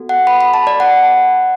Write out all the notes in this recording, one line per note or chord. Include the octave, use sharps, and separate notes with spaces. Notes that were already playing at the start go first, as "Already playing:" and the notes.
Already playing: B3 F#4 A4
F#5
B5
B5
A5
D5
F#5